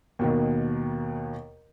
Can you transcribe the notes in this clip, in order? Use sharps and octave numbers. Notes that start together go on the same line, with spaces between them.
D#2 B2 D#3